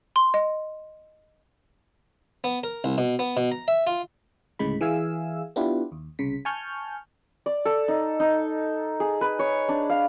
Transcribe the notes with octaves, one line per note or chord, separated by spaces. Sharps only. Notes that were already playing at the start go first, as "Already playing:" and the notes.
C6
D#5
B3
A#4
C2
B2
B3
B2
A#5
E5
F4
D2 A2 C#3 G#3 B5
E3 G#4 E5 F5 G#5 E6
B3 D4 E4 F4 G4 B4
D#2
C2 C#3 B6
G#5 A5 C#6 F6 G6
D5
A4
D#4
D#4
G#4
B4
C#5
D4
F5